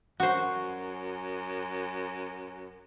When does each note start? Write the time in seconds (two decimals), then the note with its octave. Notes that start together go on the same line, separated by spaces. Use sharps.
0.20 F#2 F#4 C5